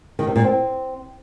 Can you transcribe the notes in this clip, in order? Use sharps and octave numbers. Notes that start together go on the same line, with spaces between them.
D#3
C3
A#2
C4